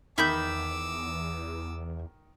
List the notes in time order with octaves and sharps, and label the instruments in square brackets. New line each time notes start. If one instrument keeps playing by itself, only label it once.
[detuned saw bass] E2 [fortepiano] D#3 [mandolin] E5 B5 G6 [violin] D6 E6